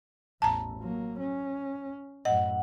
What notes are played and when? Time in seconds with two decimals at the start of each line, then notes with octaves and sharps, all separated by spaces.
0.42 A1 E2 A5 A#5
0.80 F#3 A#3
1.20 C#4
2.25 F#2 A2 D#5 F#5